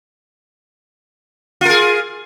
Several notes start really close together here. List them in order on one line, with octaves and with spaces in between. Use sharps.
F4 A#4 G#4